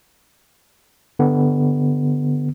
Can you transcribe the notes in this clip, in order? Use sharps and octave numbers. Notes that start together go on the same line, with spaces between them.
D3 B3